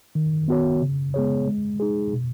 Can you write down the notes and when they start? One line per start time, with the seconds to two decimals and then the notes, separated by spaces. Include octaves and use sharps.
0.15 D#3
0.48 B3 F#4 C#5
0.81 C#3
1.14 G#3 B3 G#4 C#5
1.48 G#3
1.80 D#4 G#4
2.13 B2